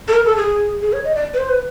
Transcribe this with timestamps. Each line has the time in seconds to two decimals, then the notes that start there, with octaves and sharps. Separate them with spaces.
0.08 A4
0.13 A#4
0.25 A4
0.37 G#4
0.82 G#4
0.93 C#5
1.04 D#5
1.15 D5
1.34 B4
1.38 C5
1.49 B4